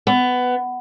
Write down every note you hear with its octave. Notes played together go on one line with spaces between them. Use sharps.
B3